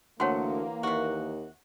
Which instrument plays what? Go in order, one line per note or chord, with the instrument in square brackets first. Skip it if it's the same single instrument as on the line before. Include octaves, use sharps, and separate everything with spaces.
[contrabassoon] D2 [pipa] D3 F#3 [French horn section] E3 A#3 [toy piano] C#5 F#5 C6
[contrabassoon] D#2 [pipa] C3 F#4